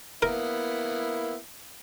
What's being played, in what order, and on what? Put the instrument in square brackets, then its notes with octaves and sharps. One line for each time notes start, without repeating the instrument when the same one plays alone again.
[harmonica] A#3 B3 E4 [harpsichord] A#4